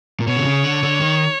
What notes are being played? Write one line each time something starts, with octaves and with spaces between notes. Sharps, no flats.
A#2
B2 C#5
D3
C#3
D3
D3
D#3